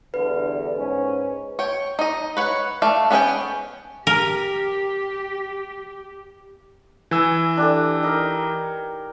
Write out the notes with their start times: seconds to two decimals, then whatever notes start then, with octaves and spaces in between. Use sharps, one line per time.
0.14 E2 G2 D3 B4
0.76 G#2 C#4
1.59 C#5 G5
1.99 D#4 D#5
2.37 B4 C#5 F#5
2.82 A3 D5 F5
3.11 B3 C#4 G#4 D#5 G5
4.07 G4 A#4
7.11 E3 G#5 E6
7.57 D4 G4 A4
8.03 D#4 A#4